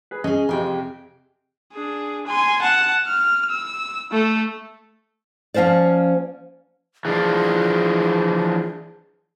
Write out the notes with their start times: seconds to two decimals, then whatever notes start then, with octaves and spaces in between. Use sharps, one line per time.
0.11 G#4 B4
0.24 C#4 G#4 D#5
0.49 F2 C3 G#4 G5
1.73 D4 G#4
2.27 G#5 C6
2.62 F#5 A5
3.07 F6
3.50 E6
4.12 A3 A4
5.54 F3 A#3 C#4 C5 D5
7.05 E3 F3 D4 G#4